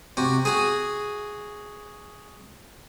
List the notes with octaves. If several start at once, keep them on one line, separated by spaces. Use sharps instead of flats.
C3 F#4
F#4 G#4